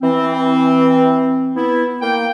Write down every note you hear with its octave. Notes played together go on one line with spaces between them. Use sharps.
E3 C4
B3 E4
A#3 G5